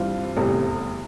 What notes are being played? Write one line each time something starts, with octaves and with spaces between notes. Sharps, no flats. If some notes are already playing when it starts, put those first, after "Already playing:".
Already playing: G2 E3 G3 C4 F4
F1 E2 C3 G3